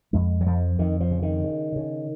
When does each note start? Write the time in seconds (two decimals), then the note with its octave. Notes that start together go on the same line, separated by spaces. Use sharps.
0.13 F2 G#3
0.41 F#3
0.46 F2 F3
0.79 F2 D#3
1.00 F3
1.11 C#3
1.22 D#3
1.44 C#3
1.76 C#3